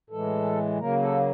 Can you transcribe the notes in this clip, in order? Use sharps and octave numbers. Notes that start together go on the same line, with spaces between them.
A2 E3 G#3 A4
C#3 F#3 A#3 A#4
A4